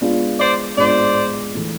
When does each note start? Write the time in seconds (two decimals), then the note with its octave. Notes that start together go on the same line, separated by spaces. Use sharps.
0.01 G#3 B3 D4 F4
0.40 C5 D5
0.77 G#3 B3 D4 F4 C5 D5
1.55 E3 A3